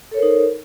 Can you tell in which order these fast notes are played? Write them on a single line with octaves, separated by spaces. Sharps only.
A4 C#5 A#4 C5 D#4